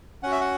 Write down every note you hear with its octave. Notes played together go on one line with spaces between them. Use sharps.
C#4 F#4 F#5
E5
F#5